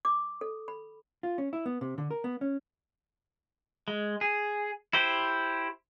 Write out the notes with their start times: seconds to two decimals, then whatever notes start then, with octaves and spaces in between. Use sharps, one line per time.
0.05 D6
0.41 A4
0.68 B5
1.23 F4
1.38 C#4
1.53 E4
1.66 B3
1.81 C3
1.98 D3
2.11 A#4
2.24 B3
2.41 C#4
3.88 G#3
4.21 G#4
4.93 E4 G4 C5